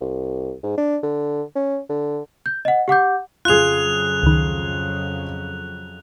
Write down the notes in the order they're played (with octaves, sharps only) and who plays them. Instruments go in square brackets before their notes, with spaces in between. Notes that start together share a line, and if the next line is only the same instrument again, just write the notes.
[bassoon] C2
G#2
D4
D3
C#4
D3
[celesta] G6
D#5 F#5
G4 F#5 D6 G6
[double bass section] F2 C#3 F#3 [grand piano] F4 G#4 [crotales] F#6 F7
[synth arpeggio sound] C#2 D#3